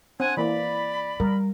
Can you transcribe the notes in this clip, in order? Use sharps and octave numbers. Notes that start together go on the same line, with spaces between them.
C4 D4 F#5 G#5
E3 A#3 D5 B5
G3 A#4